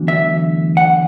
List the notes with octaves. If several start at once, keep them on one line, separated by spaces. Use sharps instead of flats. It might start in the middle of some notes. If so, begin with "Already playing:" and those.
Already playing: E2 D3 F#3 A3
E5
F#5